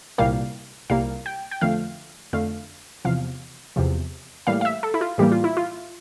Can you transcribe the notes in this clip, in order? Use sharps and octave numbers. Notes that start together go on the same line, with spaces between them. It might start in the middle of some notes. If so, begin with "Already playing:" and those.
C2 A#2 G3 A#3 F5
C2 A#2 G3 A#3 F5
G5
G5
F2 D3 A3 F5
F2 D3 A3 F5
E2 C3 F3 F5
E2 C3 F3
A2 E3 G3 A#3 F5
F5
E5
A4
E4
F4
A2 E3 G3 A#3 G4
F4
E4
F4